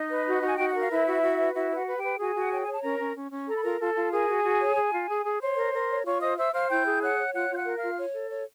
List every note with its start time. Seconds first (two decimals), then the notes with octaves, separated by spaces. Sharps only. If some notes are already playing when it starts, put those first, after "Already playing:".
Already playing: D#4 D#5
0.10 B4
0.26 F#4
0.42 F#4 G#5
0.56 F#4 G5
0.67 F#5
0.75 A#4 F5
0.90 E4 B4 E5
1.07 F#4
1.22 F#4
1.38 B4
1.54 E4 F#4 E5
1.71 B4
1.76 F#4 F#5
1.87 B4
1.97 G4 G5
2.03 B4
2.19 F#4 G#4 G#5
2.35 F#4 F#5
2.51 C#5 G5
2.61 G#5
2.67 C#5 A5
2.83 C#4 A#4 A#5
3.00 C#4
3.15 C#4
3.31 C#4
3.47 A4 A#5
3.55 B5
3.62 F4 A#4 A#5
3.80 F4 A4 A5
3.96 F4
4.12 G#4 A#4 G#5
4.28 F#4
4.44 F#4
4.60 C#5
4.77 G#4
4.92 F4
5.08 G#4
5.25 G#4
5.41 C5 C#5 C6
5.57 A#4
5.74 A#4
5.89 C#5
6.05 F4 C#5 C#6
6.21 C5 D#5 D#6
6.37 C5 E5 E6
6.53 C5 F5 F6
6.69 E4 G5 G6
6.85 G#4
7.01 C#5 F#5 F#6
7.18 C#5
7.33 F4 F#5 F#6
7.50 F4 G6
7.55 F#5 F#6
7.66 A#4
7.77 F4 F5 F6
7.98 C#5
8.14 A4
8.30 C#5